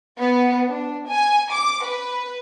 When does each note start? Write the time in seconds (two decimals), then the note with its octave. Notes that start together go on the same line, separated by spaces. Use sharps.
0.17 B3
0.70 D4
1.08 G#5
1.52 D6
1.84 B4